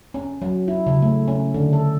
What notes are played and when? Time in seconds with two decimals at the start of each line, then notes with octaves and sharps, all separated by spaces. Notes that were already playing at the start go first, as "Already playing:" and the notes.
0.14 C#4
0.42 F#3
0.68 E4
0.87 C#3
1.02 A3
1.28 C#4
1.54 D3
1.73 A4